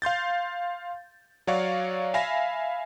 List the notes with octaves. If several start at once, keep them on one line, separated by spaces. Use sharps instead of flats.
F5 C6 G6 A6
F#3 F#4 C#5 D5 F5 C#6
E5 F5 G#5 B5 A#6